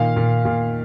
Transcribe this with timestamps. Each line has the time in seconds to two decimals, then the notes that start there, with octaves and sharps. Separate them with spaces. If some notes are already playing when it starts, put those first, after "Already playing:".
Already playing: A#2 D#3 F5
0.16 A#2
0.45 A#2